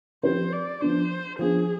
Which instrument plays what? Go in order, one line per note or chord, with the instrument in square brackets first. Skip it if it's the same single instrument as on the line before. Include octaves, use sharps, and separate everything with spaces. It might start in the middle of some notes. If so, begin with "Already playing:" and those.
[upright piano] F3 C4 G4 B4 [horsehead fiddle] C5
[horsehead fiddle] D5
[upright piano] F3 B3 D4 [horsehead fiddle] C5
[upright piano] F3 B3 D4 [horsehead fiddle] G#4